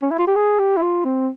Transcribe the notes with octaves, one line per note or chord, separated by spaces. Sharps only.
C#4
E4
F4
G4
G#4
G4
E4
F4
C4